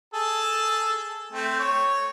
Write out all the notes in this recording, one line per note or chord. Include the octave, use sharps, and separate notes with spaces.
G#4 A4 A5
A3 C4
C#5